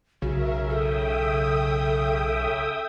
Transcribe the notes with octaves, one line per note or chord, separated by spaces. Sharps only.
B1 C#3 F#4 A#4 E5
A4 E5 G5 D#6